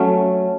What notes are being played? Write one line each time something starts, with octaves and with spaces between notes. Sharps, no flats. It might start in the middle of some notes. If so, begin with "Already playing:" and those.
Already playing: F#3 A3 C#4